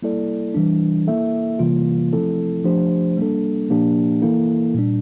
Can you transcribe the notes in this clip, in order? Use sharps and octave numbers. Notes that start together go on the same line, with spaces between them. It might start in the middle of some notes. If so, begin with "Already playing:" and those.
G3 A#3 E4 A4 D5
E3 G3 D4
A#3 E4 A4 E5
C3 E3 G3 A#3 F4
F3 A3 C4 E4 A4
F3 A3 D4 G4 C5
G3 A#3 D4 A4
A#2 F3 A#3 D4 G4
E3 A#3 E4 A4
A#2 G3 D4